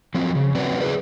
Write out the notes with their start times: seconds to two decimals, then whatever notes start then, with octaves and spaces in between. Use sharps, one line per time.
0.14 F3 F#3 C4
0.35 C#3
0.55 F#3 C4 C#4 F#4 B4 D5
0.80 G#4 B4 D5